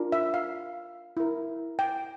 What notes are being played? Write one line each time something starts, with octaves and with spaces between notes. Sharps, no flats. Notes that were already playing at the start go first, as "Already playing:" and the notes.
Already playing: D4 F4 A#4
E5
F5
E4 A#4
G5